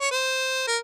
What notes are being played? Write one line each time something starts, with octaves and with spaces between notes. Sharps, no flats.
C#5
C5
A#4